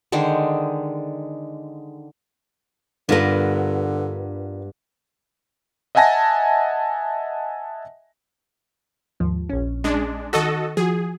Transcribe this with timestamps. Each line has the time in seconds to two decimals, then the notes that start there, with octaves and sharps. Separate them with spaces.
0.12 D3 D#3 G#3 C5
3.09 G2 D3 G3 B3 F4 A#4
5.95 D#5 E5 F#5 G#5 A5 A#6
9.20 D#2 G#2 F3
9.49 A#1 C#4
9.84 G#3 D4
10.33 D#3 F#4 A4 D#5 A#6
10.77 F3 F#4 G#4